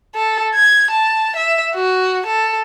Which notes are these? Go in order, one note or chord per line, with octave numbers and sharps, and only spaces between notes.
A4
G#6
A5
E5
F#4
A4